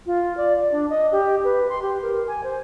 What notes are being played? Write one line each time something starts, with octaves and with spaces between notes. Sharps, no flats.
F4
D5
D5
D4
D#5
G4
B4
C6
G4
A#4
G#5
C5